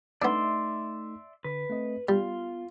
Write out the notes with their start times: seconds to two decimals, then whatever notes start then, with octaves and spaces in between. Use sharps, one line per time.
0.22 A3 B3 D4 D#4 D5 E5 C6
1.44 D3 B4
1.70 A3 C4 D#5
2.09 G3 B3 F4